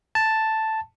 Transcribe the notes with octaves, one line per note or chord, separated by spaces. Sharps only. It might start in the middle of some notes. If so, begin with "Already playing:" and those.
A5